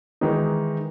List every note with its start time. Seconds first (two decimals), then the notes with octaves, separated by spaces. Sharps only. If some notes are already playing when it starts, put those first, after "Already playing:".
0.21 D#3 E3 G#3 D#4